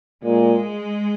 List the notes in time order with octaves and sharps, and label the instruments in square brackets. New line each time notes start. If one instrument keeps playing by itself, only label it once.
[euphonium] A#2 [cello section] G#3